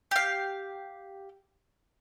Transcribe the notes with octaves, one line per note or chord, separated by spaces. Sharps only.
G4 F5